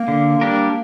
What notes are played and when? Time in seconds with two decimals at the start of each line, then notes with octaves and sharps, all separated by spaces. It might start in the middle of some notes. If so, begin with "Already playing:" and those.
Already playing: A#3
0.08 D3
0.41 G3 D4 G4 A#4